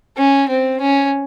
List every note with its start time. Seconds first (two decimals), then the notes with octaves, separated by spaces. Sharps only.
0.18 C#4
0.49 C4
0.80 C#4